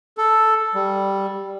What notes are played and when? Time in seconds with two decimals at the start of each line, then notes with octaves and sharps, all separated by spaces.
0.18 A4
0.75 G3